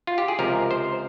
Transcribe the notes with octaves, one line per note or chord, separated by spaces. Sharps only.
F4
G4
G#4
C#2 C3 F3 A#4
C5